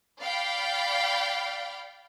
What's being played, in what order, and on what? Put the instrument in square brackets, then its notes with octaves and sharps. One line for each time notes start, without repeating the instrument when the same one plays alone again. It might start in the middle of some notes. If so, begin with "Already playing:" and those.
[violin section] D5 F5 G5 B5